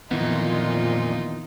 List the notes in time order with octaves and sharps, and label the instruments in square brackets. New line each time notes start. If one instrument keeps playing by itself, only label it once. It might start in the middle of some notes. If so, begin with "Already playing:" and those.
[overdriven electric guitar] F2 [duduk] A#2 [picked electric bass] D#3 E3 B3 [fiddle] D#4 F4